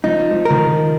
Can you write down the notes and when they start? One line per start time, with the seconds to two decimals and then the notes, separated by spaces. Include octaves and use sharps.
0.04 F3 D#4
0.31 F3
0.45 A#4
0.50 D#3
0.59 F3